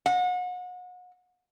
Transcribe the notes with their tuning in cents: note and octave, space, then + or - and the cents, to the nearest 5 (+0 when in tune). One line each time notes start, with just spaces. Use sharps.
F#5 -35